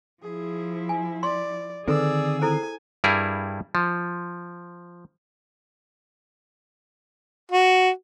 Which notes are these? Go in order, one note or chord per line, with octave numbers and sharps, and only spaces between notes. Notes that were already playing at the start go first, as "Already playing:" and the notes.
F3 E4 G#4
G#5
D5 C6
D3 D#3 C4 G#4 A4 B4 D5 E6
E4 A4 C5 G#5
G2 G3 E4 G#4 A#4
F3
F#4